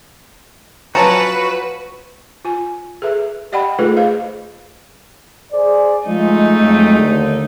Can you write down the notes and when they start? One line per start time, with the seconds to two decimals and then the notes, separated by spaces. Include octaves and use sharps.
0.95 F3 F#3 C#4 F#4 B4 A5 A#5
2.45 F4 G#5
3.02 G#4 A4 B4 E5
3.52 G4 D5 D#5 F#5 G5 B5
3.79 A3 D#4 F4 G#4 A4 B4
3.97 G#4 C5 D#5 F5
5.52 G#4 C5 D5
6.07 F3 G#3 A3 D#4
6.58 F2 F#3 G#3
6.99 D#2 D3